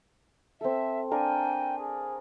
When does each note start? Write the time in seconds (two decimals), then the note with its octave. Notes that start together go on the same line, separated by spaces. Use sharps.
0.61 C4 A4 E5
1.11 D4 A#4 F5 G5 G#5
1.78 G#4